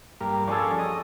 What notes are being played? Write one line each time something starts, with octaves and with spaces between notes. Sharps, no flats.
G2 A#3 G4
F3 G3 C#4 D4 G#4 A4
D#5